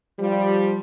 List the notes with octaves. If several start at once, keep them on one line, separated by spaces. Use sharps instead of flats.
F3 G3